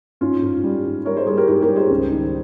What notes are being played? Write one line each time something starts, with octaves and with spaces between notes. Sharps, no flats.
G#2 C#4 F4
G#2
G3
G#2
G3 A#4 C#5
G#4 C5
G3 G#4 C5
G4 A#4
G#2 G4 A#4
G4 A#4
G3
G#4 C5
C#2
D#3